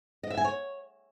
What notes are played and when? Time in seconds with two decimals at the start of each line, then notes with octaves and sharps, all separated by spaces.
0.23 D#5
0.30 E5
0.37 G#5
0.44 C#5